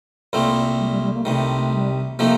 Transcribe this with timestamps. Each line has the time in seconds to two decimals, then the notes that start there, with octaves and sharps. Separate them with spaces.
0.33 C2 A#2 A3 C4
0.79 G3
0.90 G3
1.02 G3
1.14 A#3
1.25 C2 C3 D#3 A3
1.73 G3
2.18 C3 F3 A3 A#3 D#4